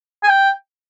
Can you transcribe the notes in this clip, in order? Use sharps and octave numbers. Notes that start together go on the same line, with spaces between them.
G#5
G5